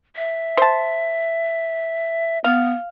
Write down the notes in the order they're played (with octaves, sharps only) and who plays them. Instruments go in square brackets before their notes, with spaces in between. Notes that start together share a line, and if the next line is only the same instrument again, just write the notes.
[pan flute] E5
[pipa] C5 A5
[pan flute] B3 [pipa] F5